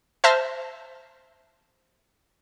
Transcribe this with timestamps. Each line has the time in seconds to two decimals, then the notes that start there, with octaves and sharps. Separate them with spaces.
0.24 C5 E5 A5 F6 A#6